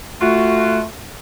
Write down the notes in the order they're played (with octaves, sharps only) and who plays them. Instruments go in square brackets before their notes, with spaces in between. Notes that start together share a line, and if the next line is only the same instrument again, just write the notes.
[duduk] A3 [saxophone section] F4 F#4